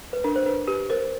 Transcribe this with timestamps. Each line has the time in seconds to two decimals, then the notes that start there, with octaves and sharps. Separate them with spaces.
0.13 B4
0.24 D4 A#4
0.36 C5
0.46 D4 B4
0.68 G4 B4
0.90 A#4 C5